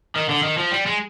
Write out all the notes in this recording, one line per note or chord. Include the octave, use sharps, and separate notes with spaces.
D#3
D3
D#3
F3
G3
G#3